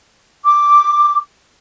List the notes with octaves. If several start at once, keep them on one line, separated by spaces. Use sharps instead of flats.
D6